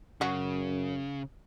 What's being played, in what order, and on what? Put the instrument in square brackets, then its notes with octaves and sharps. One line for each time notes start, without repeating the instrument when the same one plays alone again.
[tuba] F#2 [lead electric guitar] C#3 [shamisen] C#4 F#4